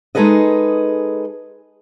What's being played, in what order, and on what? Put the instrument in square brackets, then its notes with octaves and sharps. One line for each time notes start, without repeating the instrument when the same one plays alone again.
[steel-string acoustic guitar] G#3 D#4 G#4 A4 B4 D#5